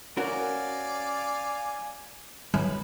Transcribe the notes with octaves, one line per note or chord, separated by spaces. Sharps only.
C#4 F#4 A#4 D5 F5 G#5
F#3 B4